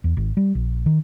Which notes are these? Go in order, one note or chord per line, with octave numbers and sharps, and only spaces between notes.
E2
G#1
G3
A#1
D#3